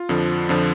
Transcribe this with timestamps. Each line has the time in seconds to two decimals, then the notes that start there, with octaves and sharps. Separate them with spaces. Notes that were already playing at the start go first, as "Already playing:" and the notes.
Already playing: F4
0.09 F2 D3 F3
0.49 F2 D3 F3